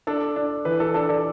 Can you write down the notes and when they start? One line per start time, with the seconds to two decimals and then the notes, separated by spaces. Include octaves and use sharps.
0.07 D4 A4 D5
0.36 D4
0.65 E3 B4
0.80 A4
0.94 D4 A4
1.09 A4 D5